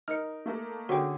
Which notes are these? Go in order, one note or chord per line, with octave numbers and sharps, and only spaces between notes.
D#4 A#4 F6 C#7
A3 A#3 A4
D3 C#4 F#4 G#4 G5